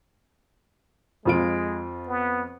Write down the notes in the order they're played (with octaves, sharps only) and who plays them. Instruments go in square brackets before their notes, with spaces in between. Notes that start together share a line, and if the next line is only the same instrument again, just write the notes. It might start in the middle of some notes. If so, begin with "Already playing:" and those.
[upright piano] F2 F4 D7 [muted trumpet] G#3
[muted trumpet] B3